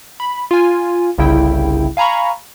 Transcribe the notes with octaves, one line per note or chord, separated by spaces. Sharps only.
B5
F4 G#5
G1 C2 C#3 E4 G5
F5 G#5 A#5 B5 C#6